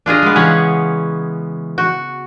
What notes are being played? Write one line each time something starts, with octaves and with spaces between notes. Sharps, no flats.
D4 F4 G#4 D#5
G#3 B3
C#3 E3 C#4 C#5 F#5
F#4